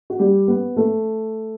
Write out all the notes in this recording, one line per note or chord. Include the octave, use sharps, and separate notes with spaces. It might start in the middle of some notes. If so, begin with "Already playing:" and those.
F#4
G3 G4
B3 B4
A3 A4